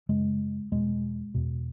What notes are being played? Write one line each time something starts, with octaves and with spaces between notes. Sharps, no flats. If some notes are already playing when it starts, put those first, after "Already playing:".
F#2 C#3 G#3
E2 B2 G#3
E2 B2